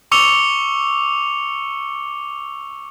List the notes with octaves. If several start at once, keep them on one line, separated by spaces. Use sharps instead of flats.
C#6 D6 E6 C#7 F7 G7